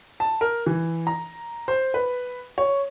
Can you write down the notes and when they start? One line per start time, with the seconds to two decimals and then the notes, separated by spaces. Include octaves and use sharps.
0.20 A5
0.41 A#4
0.67 E3
1.07 A#5
1.68 C5
1.94 B4
2.58 C#5